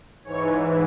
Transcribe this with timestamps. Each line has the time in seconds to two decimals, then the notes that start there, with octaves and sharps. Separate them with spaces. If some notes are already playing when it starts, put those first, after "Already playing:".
0.25 G#2 E3 C#5